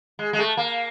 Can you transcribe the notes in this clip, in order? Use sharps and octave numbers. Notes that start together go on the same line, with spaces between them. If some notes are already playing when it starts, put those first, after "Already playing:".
G#3
G#3
A3
A#3